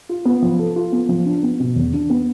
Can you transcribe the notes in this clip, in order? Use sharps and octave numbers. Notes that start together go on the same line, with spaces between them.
F4
B3
F3
A4
F4
B3
F3
D4
B3
B2
E2
D4
B3